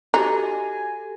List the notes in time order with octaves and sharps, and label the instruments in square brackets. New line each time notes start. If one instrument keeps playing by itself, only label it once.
[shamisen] D#4 [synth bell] F#4 G4 A4 [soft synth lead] G#5